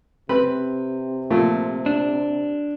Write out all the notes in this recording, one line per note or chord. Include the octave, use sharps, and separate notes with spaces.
C3 C4 B4 B5
A#2 F3 A3
D4